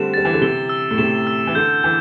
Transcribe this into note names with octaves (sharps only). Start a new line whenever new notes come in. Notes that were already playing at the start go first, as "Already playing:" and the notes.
Already playing: D3 G3 A3 C4 E7
G3 A6
E3
D3
C3 G7
E6
A2
C3 E7
E6
E3
D3 G6
E3 G6